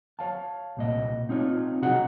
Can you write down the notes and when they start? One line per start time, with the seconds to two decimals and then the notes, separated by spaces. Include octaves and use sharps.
0.19 C#5 F5 A5
0.77 C2 A#2 D#5
1.29 C4 D#4 F4 C#5
1.82 C3 F#4 G#4 D#5 F#5 A#5